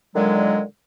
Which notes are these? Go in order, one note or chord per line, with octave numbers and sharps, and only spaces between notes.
A#2 D3 D#3 F#3 G#3